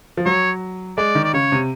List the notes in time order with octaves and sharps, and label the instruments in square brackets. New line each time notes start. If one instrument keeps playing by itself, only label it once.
[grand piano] F3
[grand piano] F#3 [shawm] C#5
[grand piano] G#3 [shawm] D5
[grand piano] D#3
[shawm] D5
[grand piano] C#3 [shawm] C#5
[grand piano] C3